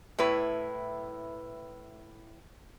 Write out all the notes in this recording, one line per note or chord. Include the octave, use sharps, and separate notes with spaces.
A2 E4 B4